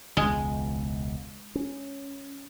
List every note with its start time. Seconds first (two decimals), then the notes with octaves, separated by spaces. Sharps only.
0.17 E1 C#2 G#3
1.55 C#4